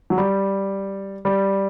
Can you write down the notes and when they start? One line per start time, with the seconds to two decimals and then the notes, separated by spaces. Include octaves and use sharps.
0.10 F#3
0.18 G3
1.25 G3